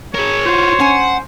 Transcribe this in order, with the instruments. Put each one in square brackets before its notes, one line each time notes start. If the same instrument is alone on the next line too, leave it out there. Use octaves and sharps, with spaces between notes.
[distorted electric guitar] G#4 A#4 [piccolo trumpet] C#5
[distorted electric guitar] F4 F#4 [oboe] C5
[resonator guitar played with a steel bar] C#4 G#5 [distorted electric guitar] F#5